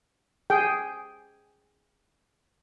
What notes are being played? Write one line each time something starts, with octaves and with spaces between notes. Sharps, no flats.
G#4 G5